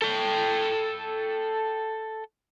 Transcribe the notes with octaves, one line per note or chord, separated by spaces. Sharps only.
A4 G5